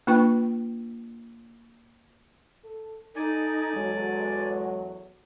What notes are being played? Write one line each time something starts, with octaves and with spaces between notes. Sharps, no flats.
A#3 D4 F4 B4 G5 C#6
A4
D#4 A4 D5 G#5
E2 F#3 G#3